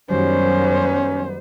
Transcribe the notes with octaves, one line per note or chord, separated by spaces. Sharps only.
F#2 D#3 F#3 G3 B3 C#4 C5